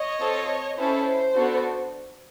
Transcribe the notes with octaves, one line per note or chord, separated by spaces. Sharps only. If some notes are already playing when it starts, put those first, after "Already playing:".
Already playing: C#5 D#5
C4 F4 A4
C#4 E4 A4 C5
C5
B3 D4 F#4 A4